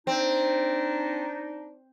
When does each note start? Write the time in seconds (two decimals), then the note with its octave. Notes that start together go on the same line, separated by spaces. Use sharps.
0.07 C4 D4 D#4